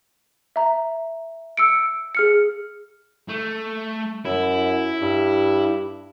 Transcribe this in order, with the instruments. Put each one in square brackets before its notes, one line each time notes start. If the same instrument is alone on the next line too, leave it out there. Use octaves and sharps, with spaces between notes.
[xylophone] E5 A#5
E6 C#7 D7
G#4 F6 C#7
[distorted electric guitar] A3
[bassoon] F#2 [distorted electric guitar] E4
[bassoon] G2